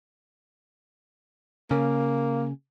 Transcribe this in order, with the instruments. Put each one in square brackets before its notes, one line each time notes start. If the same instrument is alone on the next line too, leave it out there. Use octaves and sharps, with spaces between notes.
[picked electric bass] C#3 [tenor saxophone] A#3